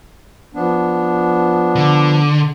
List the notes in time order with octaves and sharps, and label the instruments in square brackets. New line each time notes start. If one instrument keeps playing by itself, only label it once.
[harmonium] F3 B3 D4
[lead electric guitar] D3